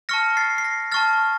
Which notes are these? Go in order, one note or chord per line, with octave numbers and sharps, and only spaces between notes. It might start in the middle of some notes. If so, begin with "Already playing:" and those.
A5 C#6 F6 A#6 C#7
A6 C7
C7
A#6
A5 C#6 F6 A6